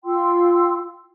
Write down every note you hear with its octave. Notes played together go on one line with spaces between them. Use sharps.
F4 G5 C6 E6